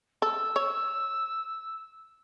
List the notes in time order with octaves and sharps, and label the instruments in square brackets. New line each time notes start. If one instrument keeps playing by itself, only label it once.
[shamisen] A4 [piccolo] E6
[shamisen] C#5